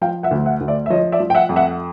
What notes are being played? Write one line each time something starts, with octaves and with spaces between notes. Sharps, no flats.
F3 F5 G5
E5 F#5
D2
E5 F#5
D2
D5 E5
E5
F3 C#5 D#5
D5 E5
F3
G5
E5 F#5
F2
E5 F#5